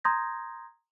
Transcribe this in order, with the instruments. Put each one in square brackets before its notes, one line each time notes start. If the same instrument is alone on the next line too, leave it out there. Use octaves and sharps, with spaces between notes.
[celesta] A#5 C6 D#6 G6 G#6 A#6